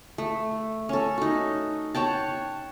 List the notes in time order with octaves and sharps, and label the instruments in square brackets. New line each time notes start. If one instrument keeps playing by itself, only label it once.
[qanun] A3
C#4 A4
D#4 F#4
C#5 F#5 G5 A5